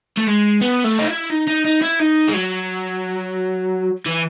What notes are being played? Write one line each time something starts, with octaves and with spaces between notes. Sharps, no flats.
A3
G#3
B3
A3
D#4
E4
D#4
D#4
D#4
E4
D#4
G#3
F#3
E3